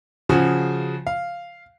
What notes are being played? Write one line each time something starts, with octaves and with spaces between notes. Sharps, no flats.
C#3 F3 F#4 G#4
F5